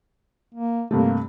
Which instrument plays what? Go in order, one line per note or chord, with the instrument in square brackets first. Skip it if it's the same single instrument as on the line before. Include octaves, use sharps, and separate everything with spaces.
[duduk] A#3
[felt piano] G2 C3 A3 [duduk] A#3